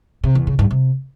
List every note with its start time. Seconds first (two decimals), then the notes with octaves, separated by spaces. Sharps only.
0.24 C3
0.35 E2
0.47 C#3
0.59 G2
0.71 C3